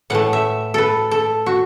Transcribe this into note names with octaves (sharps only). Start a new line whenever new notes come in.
A2 E3 A3 F#5
E5
A4 B4
A4
F#4